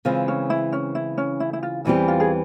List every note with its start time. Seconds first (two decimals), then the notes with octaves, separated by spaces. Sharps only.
0.05 C#3 E3 G#3 C4 F4
0.28 C#4
0.50 E4
0.73 C#4
0.95 E4
1.18 C#4
1.40 E4
1.53 E4
1.63 F4
1.85 E2 E3 G3 C4 E4 G4
2.08 F4
2.20 G#4